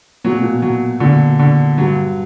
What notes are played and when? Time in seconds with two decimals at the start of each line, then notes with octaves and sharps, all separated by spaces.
0.24 A#2 F#3
0.33 B2
0.42 A#2
0.62 F#3
1.00 A#2 D3
1.39 D3
1.78 G2 F#3